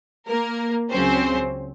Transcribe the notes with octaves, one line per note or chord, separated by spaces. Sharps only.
A#3 A#4
C#2 C#3 F#3 C4 C#4 C5